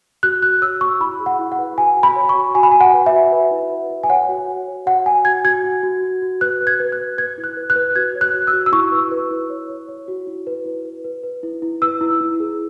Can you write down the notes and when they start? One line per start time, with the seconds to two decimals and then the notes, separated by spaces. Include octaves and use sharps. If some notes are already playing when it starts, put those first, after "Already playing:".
0.23 F#4 F#6
0.42 F#4 F#6
0.62 C#5 E6
0.81 F#4 C#6
1.00 E4 B5
1.20 G#4
1.26 F#5
1.39 E4
1.52 F#5
1.58 B4
1.78 F#4 G#5
1.97 F#4
2.03 B5
2.16 C#5
2.29 C#6
2.35 F#4
2.55 F#4 G#5
2.63 B5
2.72 F#4 G#5
2.81 F#5
2.93 B4
3.06 E5
3.12 F#4
3.32 B4
3.51 E4
3.71 B4
3.90 B4
4.03 G#5
4.09 C#5 F#5
4.29 F#4
4.48 F#4
4.68 C#5
4.86 F#4 F#5
5.06 F#4 G#5
5.25 F#4 G#6
5.44 F#4 G#6
5.64 F#4
5.83 F#4
6.02 F#4
6.22 F#4
6.41 B4 F#6
6.60 B4
6.67 G#6
6.80 B4
6.92 F#6
6.99 B4
7.18 B4 G#6
7.38 E4
7.44 F#6
7.57 B4
7.70 F#6
7.76 B4
7.95 F#4 G#6
8.15 C#5
8.21 F#6
8.34 F#4
8.47 E6
8.53 F#4
8.66 E6
8.72 E4 C#6
8.92 B4
9.11 B4
9.31 E4
9.50 C#5
9.69 C#5
9.89 C#5
10.08 F#4
10.27 E4
10.47 B4
10.66 E4
10.85 B4
11.04 B4
11.23 B4
11.43 E4
11.62 E4
11.82 B4 E6
12.01 E4
12.21 E4
12.40 G#4